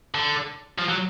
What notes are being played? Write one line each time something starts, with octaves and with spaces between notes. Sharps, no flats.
D3
F3
F#3